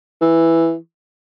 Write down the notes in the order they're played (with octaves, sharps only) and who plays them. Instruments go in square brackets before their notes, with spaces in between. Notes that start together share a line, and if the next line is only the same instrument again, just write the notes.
[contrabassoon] E3